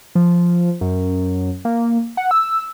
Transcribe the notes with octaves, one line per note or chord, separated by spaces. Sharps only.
F3
F#2
A#3
F#5
E6